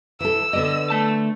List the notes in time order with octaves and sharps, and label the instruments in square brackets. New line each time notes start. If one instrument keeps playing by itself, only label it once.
[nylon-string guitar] E3 A4 [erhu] E6
[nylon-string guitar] D3 B3 D5 [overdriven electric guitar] D#5
[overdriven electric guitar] A3 A5